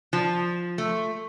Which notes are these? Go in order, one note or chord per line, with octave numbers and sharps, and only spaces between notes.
F3
A3